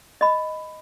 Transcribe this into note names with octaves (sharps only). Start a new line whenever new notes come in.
D#5 B5